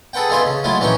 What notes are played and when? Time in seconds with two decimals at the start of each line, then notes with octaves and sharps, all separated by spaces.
0.13 G#4 A4 B4 F#5 G5
0.29 A3 B3 D#4 F4 G#4 E5
0.45 C#3
0.64 F#3 G#3 A3 E4 F4
0.80 A#1 E3 C#4 D#4 C#5 G5